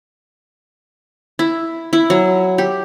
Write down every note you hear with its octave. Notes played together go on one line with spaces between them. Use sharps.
E4
E4
F#3
G4